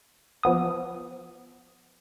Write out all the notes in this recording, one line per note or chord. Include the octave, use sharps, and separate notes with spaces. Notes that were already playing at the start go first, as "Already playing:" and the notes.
F3 B3 D#6